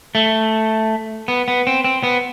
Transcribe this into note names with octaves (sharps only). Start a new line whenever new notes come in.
A3
B3
B3
C4
C4
B3